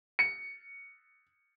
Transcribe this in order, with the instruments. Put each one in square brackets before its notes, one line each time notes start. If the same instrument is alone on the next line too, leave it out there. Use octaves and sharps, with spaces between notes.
[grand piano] C#7